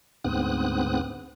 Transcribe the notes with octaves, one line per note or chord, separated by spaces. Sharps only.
D2 G#2 B3 C4 D#6 F#6